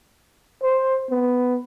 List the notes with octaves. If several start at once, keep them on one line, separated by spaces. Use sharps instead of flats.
C5
B3